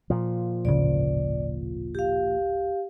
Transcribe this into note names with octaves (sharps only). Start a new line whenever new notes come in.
A#2 F3
D1 G#1 C#3 D5
G4 F5